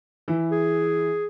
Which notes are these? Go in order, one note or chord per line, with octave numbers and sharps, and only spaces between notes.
E3 E4
G#4